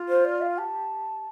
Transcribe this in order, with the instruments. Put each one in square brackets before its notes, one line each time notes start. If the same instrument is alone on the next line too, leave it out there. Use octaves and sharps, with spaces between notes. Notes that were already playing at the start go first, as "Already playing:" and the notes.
Already playing: [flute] F4
[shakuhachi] C5
D5
F5
[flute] G4 [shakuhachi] A5